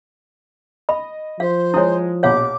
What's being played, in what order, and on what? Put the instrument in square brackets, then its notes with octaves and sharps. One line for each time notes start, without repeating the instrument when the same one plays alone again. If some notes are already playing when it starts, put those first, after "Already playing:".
[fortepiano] D#5 [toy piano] B5
[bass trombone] F3 [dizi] C5 [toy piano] F5
[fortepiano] G#3 D#6 [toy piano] E4 C#5
[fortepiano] A#1 B2 F#5 [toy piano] C#5 F5 [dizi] D6